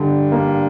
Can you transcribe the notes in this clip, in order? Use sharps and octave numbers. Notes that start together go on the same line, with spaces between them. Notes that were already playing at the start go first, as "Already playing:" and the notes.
Already playing: G2 D3
A#3